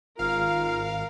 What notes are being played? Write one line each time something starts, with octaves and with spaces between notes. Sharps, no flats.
G#1 F4 A#4 F5 F6